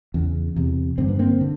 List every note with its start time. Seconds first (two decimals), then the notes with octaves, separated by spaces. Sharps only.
0.14 E2 C#3
0.56 E2 C3
0.98 G2 D3 C4
1.09 B3
1.19 A#3 C4
1.41 D3